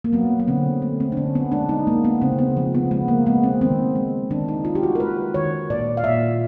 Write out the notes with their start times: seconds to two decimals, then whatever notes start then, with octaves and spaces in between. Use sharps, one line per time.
0.04 A#3
0.13 F#3 B3
0.40 B3
0.47 D3 C4
0.82 A3
1.00 C4
1.12 D4
1.17 D3 C#4
1.35 B3
1.52 G#3 D4
1.69 D#4
1.87 G#3 A#3
2.05 B3
2.21 C#3 C4
2.39 B3
2.57 F3
2.75 B3
2.91 G#3 B3
3.08 A#3
3.26 G#3 B3
3.43 C4
3.61 D#3 C4
3.95 G#3
4.30 D#3 D4
4.49 D#4
4.65 D#3 F4
4.75 G4
4.83 F#4
4.95 A#4
5.00 G#3 B4
5.34 D#3 C#5
5.70 A#2 D5
5.97 F5
6.04 A#2 E5